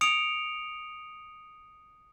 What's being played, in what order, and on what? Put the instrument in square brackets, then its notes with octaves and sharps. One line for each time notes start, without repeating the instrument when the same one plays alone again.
[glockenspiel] D#6 C#7 D7 F7